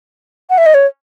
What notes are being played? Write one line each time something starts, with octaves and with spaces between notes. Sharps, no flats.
F#5
E5
D#5
C#5